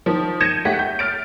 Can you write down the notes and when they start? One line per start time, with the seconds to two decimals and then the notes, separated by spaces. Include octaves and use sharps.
0.06 D#3 F3
0.40 G6 G#6 A#6 C#7 D#7 E7
0.65 A3 G4 F#5 B6
0.79 G6
0.99 F6 A6 D7